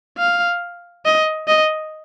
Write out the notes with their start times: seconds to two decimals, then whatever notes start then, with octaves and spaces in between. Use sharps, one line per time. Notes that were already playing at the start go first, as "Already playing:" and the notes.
0.18 F5
1.05 D#5
1.48 D#5